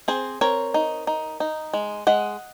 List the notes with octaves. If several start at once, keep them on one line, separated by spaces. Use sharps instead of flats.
C4 G#4 C5
C4 A#4 C#5
D#4
D#4
D#4
G#3
G#3 D#5 F#5